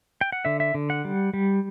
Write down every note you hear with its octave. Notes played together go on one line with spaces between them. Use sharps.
G5
F#5
D3 E5
E5
D3
F#5
G3
G3